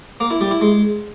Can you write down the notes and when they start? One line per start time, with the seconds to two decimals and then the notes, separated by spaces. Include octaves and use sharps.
0.20 A#3
0.31 E4
0.41 G3
0.51 E4
0.61 G#3